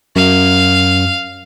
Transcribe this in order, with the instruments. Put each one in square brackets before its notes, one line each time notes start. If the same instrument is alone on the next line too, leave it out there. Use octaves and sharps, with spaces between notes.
[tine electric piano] F#2 [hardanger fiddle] F5